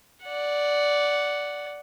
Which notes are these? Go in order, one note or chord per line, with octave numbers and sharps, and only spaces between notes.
D5 F#5